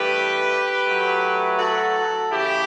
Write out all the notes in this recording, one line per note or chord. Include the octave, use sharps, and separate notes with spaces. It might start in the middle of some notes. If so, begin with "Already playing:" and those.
Already playing: G2 E3 A3 G4 B4
A2 F#3 A3
F#4 A4
C#3 E3 A3 E4 G4